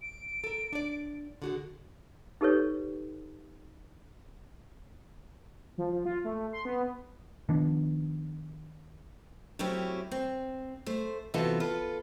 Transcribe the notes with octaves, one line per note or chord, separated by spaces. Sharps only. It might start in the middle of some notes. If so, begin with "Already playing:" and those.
D7
A4 A#4
D4 D5
D3 F#4 G#4
D#4 G4 A4 B4 C#5
F3
F3
F4
A3
C6
B3
D#3 F3 B3 D4
F#3 A3 C4 C#4 E4 G4
C4
A3 C5
C3 E3 B3 F4 F#4 A4
F4 A4 B4